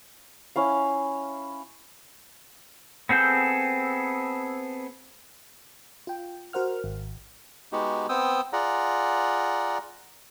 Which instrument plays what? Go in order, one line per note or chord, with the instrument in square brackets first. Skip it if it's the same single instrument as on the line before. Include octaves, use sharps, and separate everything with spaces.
[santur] C#4 E4 F5
[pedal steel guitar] B3 C4 G#4 A4 G6
[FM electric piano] F4 G5
F#4 A#4 C5 F#5 F6
G#1
[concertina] G#3 B3 D#4 F#4 G4
B3 C4 G5 D#6 E6
F4 G#4 D5 F#5 A#5